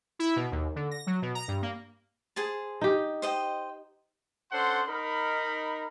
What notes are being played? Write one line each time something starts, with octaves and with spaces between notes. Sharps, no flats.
E4
B2
D#2
D3
A#6
F#3
B2
A#5
G2
A#3
G#4 C5 A5
D#4 G4
C5 D#5 G5
C#4 D4 A4 C5 F#5 C6
D#4 A#4 B5